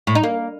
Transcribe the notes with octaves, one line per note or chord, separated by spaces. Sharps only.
A2
D#4
A#3